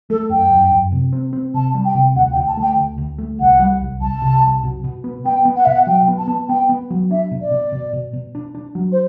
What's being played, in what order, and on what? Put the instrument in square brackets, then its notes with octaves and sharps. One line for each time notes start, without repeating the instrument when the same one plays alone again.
[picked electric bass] A3 [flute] A4
[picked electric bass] F#2 [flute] G5
[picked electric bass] F#2
F#2
C3
C4
C4
[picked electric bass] C3 [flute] A5
[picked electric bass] G3
[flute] G5
[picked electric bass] C3
[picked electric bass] D2 [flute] F#5
[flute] G5
[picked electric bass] D2
[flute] A5
[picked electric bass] A3 [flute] G5
[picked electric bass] D2
D2
A3
[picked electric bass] C2 [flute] F#5
[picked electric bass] G3
C2
[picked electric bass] C2 [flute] A5
[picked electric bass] C3
C2
B2
B2
B3
[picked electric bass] B3 [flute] G5
[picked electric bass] B3
[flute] F#5
[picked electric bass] B2 [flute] E5
[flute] F#5
[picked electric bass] F#3 [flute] G5
[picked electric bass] B3
[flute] A5
[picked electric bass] B3
[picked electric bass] B3 [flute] G5
[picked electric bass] B3
F#3
[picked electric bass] D4 [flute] E5
[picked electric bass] B2
[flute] D5
[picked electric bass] B2
B2
B2
B2
D4
D4
F#3
[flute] C5